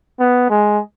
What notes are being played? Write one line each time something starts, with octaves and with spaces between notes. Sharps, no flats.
B3
G#3